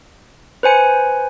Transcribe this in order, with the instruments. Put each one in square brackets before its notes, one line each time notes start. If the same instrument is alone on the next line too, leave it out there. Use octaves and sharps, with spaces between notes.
[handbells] B4 C5 G#5 C#7